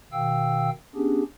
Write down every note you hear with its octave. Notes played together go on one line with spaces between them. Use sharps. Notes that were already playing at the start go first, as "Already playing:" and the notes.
B2 D#3 F5 G5 E6
B3 C#4 D4 G4 G#4